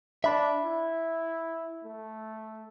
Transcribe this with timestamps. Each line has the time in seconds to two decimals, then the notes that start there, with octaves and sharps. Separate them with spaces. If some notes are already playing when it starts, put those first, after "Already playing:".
0.24 D4 E5 B5
0.64 E4
1.84 A3